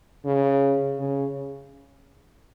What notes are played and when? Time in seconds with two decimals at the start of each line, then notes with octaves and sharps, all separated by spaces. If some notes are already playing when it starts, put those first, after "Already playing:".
0.25 C#3
0.99 C#3